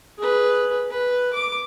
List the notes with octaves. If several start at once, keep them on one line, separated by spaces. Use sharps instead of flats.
G#4 B4
B4
D6